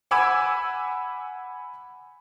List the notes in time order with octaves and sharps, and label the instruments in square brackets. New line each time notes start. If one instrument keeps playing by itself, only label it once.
[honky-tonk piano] F#5 G#5 B5 D6 E6 G#6